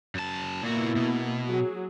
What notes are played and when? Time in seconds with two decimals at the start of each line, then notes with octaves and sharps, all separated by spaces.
0.15 F#2 A5
0.63 A#2 A#3 B3 E4 F#4
0.96 B2
1.50 F#3 G#4